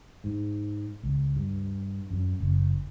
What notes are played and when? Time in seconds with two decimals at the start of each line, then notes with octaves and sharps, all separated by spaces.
0.24 G#2
1.03 C#2
1.36 G2
2.11 F#2
2.40 F#1